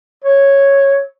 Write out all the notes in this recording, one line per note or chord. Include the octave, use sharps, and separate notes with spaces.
C#5